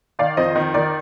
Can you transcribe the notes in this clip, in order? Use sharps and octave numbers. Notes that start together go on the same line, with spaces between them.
D#3 D5 F5
F2 C5 D#5
D#3
D#3 A#4 D5